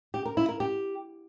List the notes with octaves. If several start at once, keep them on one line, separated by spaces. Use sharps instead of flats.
G4
A#4
E4
A#4
G4